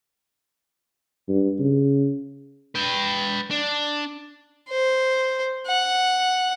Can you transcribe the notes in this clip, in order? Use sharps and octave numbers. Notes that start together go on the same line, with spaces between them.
G2
C#3
B4 G5
D4
C5
F#5